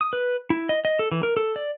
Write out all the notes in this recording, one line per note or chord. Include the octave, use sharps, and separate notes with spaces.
D#6
B4
E4
D#5
D#5
A4
E3
A#4
A4
D5